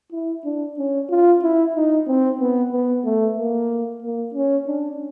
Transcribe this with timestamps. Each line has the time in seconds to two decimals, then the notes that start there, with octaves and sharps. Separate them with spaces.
0.12 E4
0.45 D4
0.78 C#4
1.09 F4
1.42 E4
1.76 D#4
2.08 C4
2.40 B3
2.72 B3
3.05 A3
3.38 A#3
4.02 A#3
4.34 C#4
4.67 D4